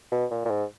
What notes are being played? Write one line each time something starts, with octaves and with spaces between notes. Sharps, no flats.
B2
A#2
A#2
G#2